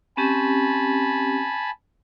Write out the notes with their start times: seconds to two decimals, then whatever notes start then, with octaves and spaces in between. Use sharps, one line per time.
0.17 C4 C#4 G4 G#5 A5 B5